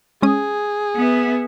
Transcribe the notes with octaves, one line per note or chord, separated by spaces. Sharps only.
G#3 C#4 G#4 D#6
B3 E5